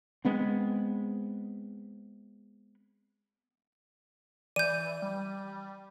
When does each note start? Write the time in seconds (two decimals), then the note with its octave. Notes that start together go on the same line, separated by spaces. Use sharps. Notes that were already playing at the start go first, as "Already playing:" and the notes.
0.25 G#3 B3 C4
4.56 E3 D5 G6 D#7
5.02 G3